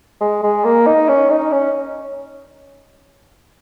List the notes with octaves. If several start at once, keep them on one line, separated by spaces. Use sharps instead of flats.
G#3
G#3
A#3
D#4
C#4
D#4
C#4